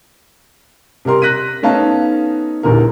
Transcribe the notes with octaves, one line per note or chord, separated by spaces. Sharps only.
C3 G3 A#4 C6
F#6 A#6 B6 D#7
A3 B3 C#4 D#4 F5 A5
D#1 A#1 E2 D3 G3 A#4